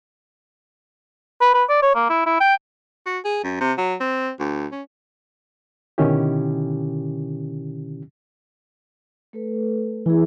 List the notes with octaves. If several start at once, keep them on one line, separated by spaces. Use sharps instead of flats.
B4
B4
D5
C#5
A#3
E4
E4
G5
F#4
G#4
F#2
C3
F#3
C4
D2
C#4
B2 D3 D#3 C#4 E4 G4
A3 A4 B4
E3 E4 G#4